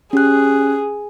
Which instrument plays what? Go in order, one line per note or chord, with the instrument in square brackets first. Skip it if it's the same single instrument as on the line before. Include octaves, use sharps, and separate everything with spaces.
[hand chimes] C#4 G4 F#6 [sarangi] G#4